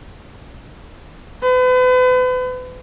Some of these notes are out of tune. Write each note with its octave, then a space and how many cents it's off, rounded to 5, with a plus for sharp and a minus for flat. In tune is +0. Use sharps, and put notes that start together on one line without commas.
B4 +40